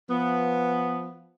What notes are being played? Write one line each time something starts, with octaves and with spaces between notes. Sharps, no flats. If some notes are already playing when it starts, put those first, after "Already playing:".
F3 B3